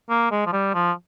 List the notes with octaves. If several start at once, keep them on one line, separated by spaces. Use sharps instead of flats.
A#3
G#3
F3
G3
F3